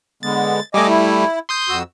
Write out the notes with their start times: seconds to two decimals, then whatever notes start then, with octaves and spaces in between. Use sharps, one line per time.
0.23 D3 G#3 B3 A6
0.74 G3 A3 D#5 G#5 D6
0.88 E4
1.49 C6 D#6 G6
1.69 F2 F#4 E6